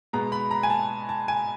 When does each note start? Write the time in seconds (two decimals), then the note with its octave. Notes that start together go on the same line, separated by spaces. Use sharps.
0.13 B2 G#3 B3 A#5
0.32 B5
0.51 A#5
0.63 G#5
0.70 A5
1.09 A5
1.28 G#5